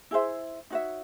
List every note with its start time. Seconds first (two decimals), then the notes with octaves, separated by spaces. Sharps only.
0.11 E4 G#4 C5 E5
0.70 D#4 F#4 C#5 E5